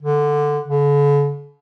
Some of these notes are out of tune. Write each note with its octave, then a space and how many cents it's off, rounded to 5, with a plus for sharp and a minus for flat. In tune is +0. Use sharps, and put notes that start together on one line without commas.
D3 +5
D3 -45